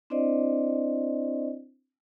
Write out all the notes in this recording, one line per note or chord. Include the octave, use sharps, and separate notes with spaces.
C4 D4 E4 C5 D5 D#5